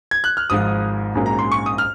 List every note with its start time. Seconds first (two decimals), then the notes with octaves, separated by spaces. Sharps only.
0.11 G#6
0.24 F#6
0.37 F6
0.50 G#1 G#2 F3 D#6
1.15 A#1 G#2 F#3 A#3 C#4
1.26 A#5
1.39 C6
1.52 C#6
1.66 D#6
1.78 F6